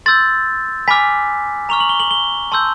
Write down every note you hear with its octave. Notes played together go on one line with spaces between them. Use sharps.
C6 E6 G6 A6
G#5 B5 D6 F6 B6
A#5 C#6 F6 F7
F#7
G7
F#7
G7
A5 C6 E6 G6